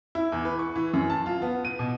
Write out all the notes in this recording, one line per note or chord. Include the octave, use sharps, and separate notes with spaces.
E4
E2
B4
C#6
E3
F#2
A5
F4
B3
D#7
B2